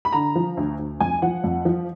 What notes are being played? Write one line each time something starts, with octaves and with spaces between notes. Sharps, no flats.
B5
D3 A#5
F3
D2
D2
F2 G#5
F3 F#5
F2
F3